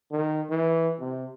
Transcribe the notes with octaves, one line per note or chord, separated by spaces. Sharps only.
D#3
E3
C3